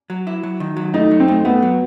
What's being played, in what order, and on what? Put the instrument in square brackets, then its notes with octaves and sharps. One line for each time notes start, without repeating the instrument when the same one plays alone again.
[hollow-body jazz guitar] F#3
E4
F#3
D#3
F#3
[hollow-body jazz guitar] A3 [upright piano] D#4
[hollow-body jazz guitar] F#3
[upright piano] C4
[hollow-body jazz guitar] A3
[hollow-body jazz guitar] A3 [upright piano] B3
[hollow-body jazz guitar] F#3